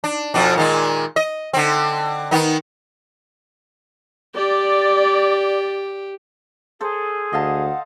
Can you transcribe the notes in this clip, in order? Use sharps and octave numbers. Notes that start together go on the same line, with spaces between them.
D4
F2 B2 D4
A#2 D#3 G#3
D#5
D3 C4
D#3 B3 D#4
G4 D5
G#4 A4 C5
D2 D#5 F5 F#5 A5